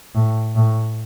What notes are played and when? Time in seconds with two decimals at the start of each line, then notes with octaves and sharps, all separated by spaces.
0.15 A2
0.55 A2